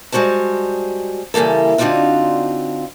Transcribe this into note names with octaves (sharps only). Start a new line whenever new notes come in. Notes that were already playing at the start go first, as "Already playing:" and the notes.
G3 G#3 F#4 C5 A5
C#3 E3 G3 A#3 A4
D3 C4 D4 D#4 F4 F#4